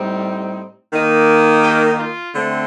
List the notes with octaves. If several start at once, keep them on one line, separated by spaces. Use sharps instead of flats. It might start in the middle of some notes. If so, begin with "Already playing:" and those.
Already playing: A2 G3 C4 D#4
D#3 A#3 D#4
G4
F4
D3 A3 C4